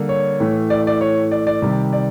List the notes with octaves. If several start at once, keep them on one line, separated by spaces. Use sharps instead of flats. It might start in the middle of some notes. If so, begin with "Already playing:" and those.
Already playing: D3 G3 A#3
C#5
A2 E3 A3
D5
D5
C#5
D5
D5
C3 D#3 G3
D5